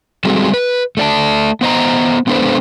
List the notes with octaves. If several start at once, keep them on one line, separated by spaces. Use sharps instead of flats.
G3 G#3 C4 F#4 G#4 A4
B4
A3 D5 A5
B3 C5 D#5 A#5
G#3 B3 D4 A4 B4 C5